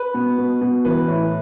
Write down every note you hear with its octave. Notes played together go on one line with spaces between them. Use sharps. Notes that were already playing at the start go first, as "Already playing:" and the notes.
Already playing: B4
B2
B2
B2
E3 B4
A2